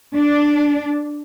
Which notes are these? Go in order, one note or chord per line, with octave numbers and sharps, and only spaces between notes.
D4